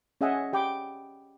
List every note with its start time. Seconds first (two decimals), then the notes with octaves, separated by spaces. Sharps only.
0.21 C#4 G#4 D#5 E5 F#5 G#5
0.53 G4 G5 B5 D6